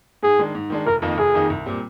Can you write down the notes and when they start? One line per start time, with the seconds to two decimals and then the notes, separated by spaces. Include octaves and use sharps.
0.23 G#2 G#4
0.39 D#3 G#3 D4
0.55 G#2
0.70 D#3 G#3 D4
0.87 F1 A#4
1.02 F2 D#3 A#3 D#4
1.18 F1 G#4
1.34 F2 D#3 A#3 D#4
1.50 C2
1.66 A#2 G3 C4